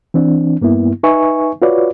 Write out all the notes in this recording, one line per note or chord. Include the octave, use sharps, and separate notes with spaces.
E3 C4 D4
G2 A#3 B3 E4
D#4 B4 E5 G#5 C#6
F4 F#4 B4 C#5 D5